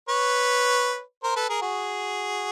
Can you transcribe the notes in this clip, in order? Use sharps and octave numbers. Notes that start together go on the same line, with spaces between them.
B4 C#5
A#4 C5
A4 B4
G#4 A#4
F#4 G#4